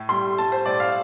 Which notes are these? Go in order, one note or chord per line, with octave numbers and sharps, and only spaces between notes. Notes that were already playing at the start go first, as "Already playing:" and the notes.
Already playing: A2
G3 C6
G3 A5
C5
A2 D5
F5